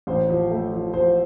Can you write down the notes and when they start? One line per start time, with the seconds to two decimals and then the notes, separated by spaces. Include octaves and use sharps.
0.07 A1 C5
0.29 F3
0.51 A3
0.73 F3
0.93 F3 C5